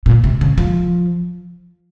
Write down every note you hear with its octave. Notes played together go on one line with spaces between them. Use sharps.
A#2
C3
C#3
F3